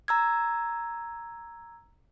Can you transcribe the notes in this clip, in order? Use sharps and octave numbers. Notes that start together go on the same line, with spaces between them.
A#5 E6 G#6